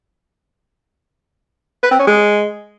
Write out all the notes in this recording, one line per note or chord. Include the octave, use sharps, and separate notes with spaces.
B4
C4
C#4
G#3